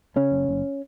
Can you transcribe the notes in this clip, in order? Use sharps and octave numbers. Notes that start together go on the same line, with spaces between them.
C#3 C#4
F#1
F#1